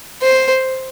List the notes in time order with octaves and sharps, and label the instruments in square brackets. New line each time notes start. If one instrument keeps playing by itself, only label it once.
[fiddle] C5